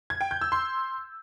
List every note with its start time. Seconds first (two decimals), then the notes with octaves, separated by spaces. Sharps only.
0.10 G#6
0.21 G5
0.31 G6
0.41 E6
0.52 C6